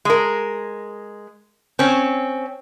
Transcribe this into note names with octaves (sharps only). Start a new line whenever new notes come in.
G#3 A#4
C4 C#4